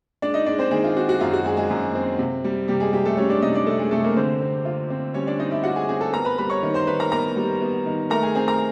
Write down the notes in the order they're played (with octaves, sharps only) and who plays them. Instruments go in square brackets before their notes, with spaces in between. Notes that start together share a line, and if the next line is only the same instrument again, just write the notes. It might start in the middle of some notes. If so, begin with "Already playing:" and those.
[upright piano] G#3 D4 D5
D#4 D#5
G#3 D4 D5
C4 C5
D#3 G#3 G#4
F4
C4 F#4
F#4
F#2 F4
F#4
G#3 G#4
G#3 G#4
F#2
C4
C3
G3
C3 G3 G4
G#3 G#4
C3 G3 G4
A3 A4
G3 C#4 C#5
D4 D5
C3 D#4 D#5
D4 D5
C3 A3 A4
G#3 G#4
C3 A3 A4
A#3 A#4
D3 C4 C5
C4
F4
C4
G3 C#4 C#5
D4 D5
C4 D#4 D#5
E4 E5
F4 F#4 F#5
G#4 G#5
C4 G#4 G#5
A4 A5
B3 A#4 A#5
B4 B5
G3 B4 B5
C#5 C#6
D#3
C5 C6
D#3 B4 B5
A#4 A#5
B3 A#4 A#5
G3
B3
D#3
A3 A#4 A#5
G#4 G#5
C4 G#4 G#5
A#4 A#5